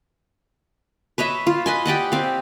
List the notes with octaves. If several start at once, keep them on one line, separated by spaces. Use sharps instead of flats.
B4 C#5 D#5 E5
F4
B4 D#5 G#5
G4 D5 D#5 F#5
C4 F5